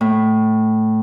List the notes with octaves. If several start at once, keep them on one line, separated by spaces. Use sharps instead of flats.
A2